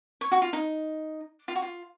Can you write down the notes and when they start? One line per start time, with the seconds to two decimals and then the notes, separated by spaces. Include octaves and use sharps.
0.21 C#5
0.32 F#4
0.42 F4
0.53 D#4
1.48 F4
1.55 F#4
1.62 F4